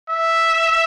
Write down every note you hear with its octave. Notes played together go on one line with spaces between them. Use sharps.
E5